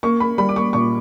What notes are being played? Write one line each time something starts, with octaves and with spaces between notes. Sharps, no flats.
A#3 C#6
A#3 B5
G3 B5
D6
A#3 C#6
A#2 C#6